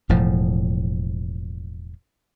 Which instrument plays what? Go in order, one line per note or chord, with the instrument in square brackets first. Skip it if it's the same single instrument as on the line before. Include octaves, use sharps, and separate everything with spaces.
[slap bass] E1 A2 F3